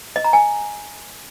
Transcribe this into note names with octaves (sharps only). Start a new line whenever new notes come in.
D#5
A#5
G#5